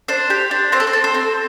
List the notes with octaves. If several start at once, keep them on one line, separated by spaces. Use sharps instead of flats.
D4 C5
G4
D4
C4 C5
A4
C5
A4
C5
C4